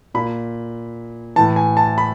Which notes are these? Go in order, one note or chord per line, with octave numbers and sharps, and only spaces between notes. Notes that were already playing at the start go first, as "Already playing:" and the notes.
A#2 B5
A2 E3 A5
G#5
A5
B5